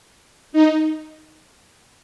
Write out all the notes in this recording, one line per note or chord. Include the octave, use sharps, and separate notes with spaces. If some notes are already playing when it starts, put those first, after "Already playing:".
D#4